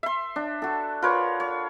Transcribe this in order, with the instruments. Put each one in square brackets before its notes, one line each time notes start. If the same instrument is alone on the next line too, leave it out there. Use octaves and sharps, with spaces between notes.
[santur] E5 C6
[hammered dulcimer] D4
F#4 A4
[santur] F4 A#4 C#5 [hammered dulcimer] B4
[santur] C#5